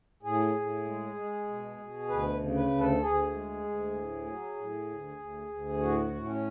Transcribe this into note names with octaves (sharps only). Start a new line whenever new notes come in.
A2 G#4
A2
G#3
G#3
B2
B2
D2 B4
C#3
B4
D2
A4
D2 G#4
G#3
D2
A2
F#3
A2
D2
D2
D2
A2 F#4
A2
C#4